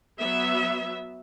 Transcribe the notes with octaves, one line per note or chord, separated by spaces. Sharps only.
F#3 B3 E5